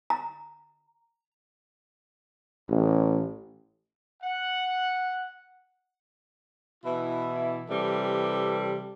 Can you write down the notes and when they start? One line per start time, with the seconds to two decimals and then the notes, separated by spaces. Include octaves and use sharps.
0.10 A#5
2.70 A1
4.22 F#5
6.84 B2 E3 E4
7.69 C3 E3 G3 A4